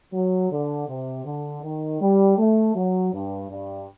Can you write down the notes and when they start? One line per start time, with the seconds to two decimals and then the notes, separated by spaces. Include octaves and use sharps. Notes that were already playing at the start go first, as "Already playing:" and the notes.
0.13 F#3
0.50 D3
0.87 C3
1.25 D3
1.63 D#3
2.01 G3
2.38 A3
2.75 F#3
3.13 G2
3.50 G2